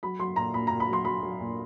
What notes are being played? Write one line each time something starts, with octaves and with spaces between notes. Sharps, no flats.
F#3 B5
F#3 C6
A#2 A#5
A#2 B5
A#2 A#5
B5
F#3 C6
F#3 B5
F#3
A#2